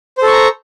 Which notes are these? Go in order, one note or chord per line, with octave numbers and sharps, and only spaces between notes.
A4 C5 A#5 C#6